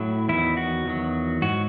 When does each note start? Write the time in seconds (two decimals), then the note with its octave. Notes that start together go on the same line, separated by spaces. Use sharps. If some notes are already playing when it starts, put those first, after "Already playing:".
Already playing: A2 F#3 E4
0.29 E2 D#3 F#3 E4
0.57 F#4
0.86 E2 D#3 F#3
1.42 G#2 F#3 F#4